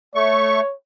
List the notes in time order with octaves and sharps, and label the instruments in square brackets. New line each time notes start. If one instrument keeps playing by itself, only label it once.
[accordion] A3 C#6 [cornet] C#5